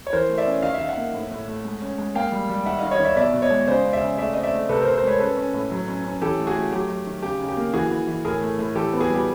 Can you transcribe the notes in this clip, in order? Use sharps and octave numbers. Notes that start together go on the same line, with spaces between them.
C#5
E3 A#4 C5
A3
D5 E5
C#4
D#3 D#5 F5
E5
D#3 F5
E5 F#5
A#3
A2
A2
A3
G#3
C#4
G#3
A#3 F5 G5
G3
G3
D#3 E5 F#5
D#3 D#5 F5
C#5 D#5
D#3 D5 E5
B2 D5 E5
B2
C#5 D#5
G#3
C#3 C5 D5
C#3
D5 E5
C#3
A3 D5 E5
C4 D#5
D5 E5
A3
C3 A4 B4
A#4 C5
C3
A#4 C5
G#3 B4 C#5
C#4 A4 B4
C#4
A2
F#3
C#4
C#4
E3 G4 A4
A3
F#4 G#4
A3
F#3 G4
F#3
D#3
C#3 G4
C#3
G4
A#3
E3 F#4 G#4
E3
E3
A2 G#4 A#4
A3
A2
E3 G4 A4
B3
F#4 G#4
G3 G4